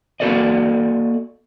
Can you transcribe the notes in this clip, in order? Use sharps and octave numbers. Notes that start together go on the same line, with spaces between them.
A#3 F#4 A4 D5 D#5